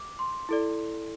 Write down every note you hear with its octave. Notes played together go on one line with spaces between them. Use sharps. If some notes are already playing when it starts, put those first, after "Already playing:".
Already playing: D6
C6
E4 A4 D5